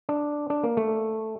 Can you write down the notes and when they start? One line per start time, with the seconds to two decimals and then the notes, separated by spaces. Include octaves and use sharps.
0.09 D4
0.50 D4
0.63 A#3
0.77 A3